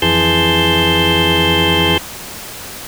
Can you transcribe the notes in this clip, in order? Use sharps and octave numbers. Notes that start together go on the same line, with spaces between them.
F2 E3 G#4 A5 C6 G6